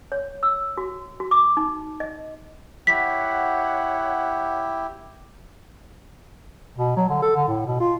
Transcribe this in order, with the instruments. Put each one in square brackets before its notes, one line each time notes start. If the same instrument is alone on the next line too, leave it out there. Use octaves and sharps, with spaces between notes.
[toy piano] C#5
E6
F#4
F#4
D6
D#4
D#5
[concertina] E4 G4 [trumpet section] C#5 F#5 [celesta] B6
[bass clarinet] B2
F#3
D3
A4
D3
A2
B2
F4